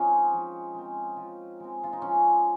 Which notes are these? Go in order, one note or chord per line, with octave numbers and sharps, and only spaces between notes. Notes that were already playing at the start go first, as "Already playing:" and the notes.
Already playing: F3 G#3 C4 C#4 D#4
F3
G#3 C4
F3
G#3 C4
F4
D#4
F3 C#4